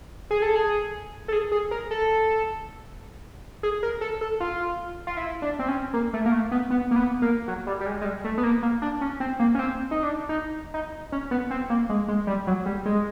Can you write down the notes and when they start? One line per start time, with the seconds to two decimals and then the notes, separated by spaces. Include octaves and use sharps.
0.31 G#4
0.42 A4
0.55 G#4
1.28 A4
1.32 G#4
1.52 G#4
1.71 A#4
1.91 A4
3.63 G#4
3.83 A#4
4.01 A4
4.21 A4
4.40 F4
5.07 F4
5.17 E4
5.42 D4
5.59 C4
5.68 C#4
5.94 A#3
6.14 A3
6.26 A#3
6.32 A3
6.51 B3
6.71 B3
6.91 A#3
6.96 B3
7.22 A#3
7.48 F#3
7.67 G3
7.81 G3
7.86 G#3
8.01 G#3
8.05 G3
8.24 A3
8.38 B3
8.43 A#3
8.63 A#3
8.82 D4
9.01 C#4
9.20 C4
9.39 A#3
9.55 C#4
9.59 C4
9.91 D#4
10.03 D4
10.29 D#4
10.74 D#4
11.12 C#4
11.31 B3
11.51 C4
11.70 A#3
11.89 G#3
12.08 G#3
12.27 G3
12.47 F#3
12.66 G3
12.86 G#3